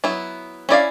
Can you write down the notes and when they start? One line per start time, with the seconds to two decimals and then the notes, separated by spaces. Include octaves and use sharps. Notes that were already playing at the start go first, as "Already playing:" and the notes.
0.04 F#3 B3 E4
0.69 C#4 E4 A4 D5 F5